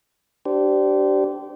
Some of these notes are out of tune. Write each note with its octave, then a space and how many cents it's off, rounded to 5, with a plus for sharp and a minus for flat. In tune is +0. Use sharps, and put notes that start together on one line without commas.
D4 -5 G4 -25 C5 -20